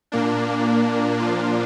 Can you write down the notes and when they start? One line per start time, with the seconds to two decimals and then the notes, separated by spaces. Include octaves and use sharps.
0.12 A#2 A#3 D4
1.20 A#2 F3 A#3 D4 F4